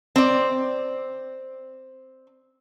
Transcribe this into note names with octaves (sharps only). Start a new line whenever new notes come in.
C4 D5